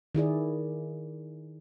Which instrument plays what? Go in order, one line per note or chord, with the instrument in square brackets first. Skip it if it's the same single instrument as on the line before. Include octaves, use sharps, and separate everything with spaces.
[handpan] D#3 E4 G#4 D5